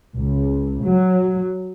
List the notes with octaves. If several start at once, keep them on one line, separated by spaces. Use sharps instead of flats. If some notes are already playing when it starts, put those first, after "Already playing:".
C#2
F#3